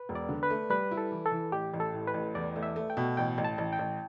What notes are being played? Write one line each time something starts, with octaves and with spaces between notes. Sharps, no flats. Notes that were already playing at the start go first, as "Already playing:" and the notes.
Already playing: B4
E1
D5
D3
B4
A3
G3 B4
E4
A4
E3
A4
E3
A1 G4
A1
A4
A2
B4
A1
E2 D5
A3
E5
A3
G5
B2
A1 G5
A1
A5
A1
G5
A1